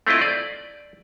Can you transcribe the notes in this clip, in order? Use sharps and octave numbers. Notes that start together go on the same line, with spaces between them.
A3 C4 E4 F4 D#5
D5